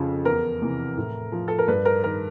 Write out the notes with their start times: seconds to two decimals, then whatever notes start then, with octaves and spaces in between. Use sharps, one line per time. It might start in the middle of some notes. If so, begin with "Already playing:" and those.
Already playing: F2 C#3 F3
0.25 E2 A#4
0.62 C3 E3
0.97 A2
1.32 F3
1.48 A4
1.58 A#4
1.68 G2 B4
1.85 A#4
2.04 D#3 A#4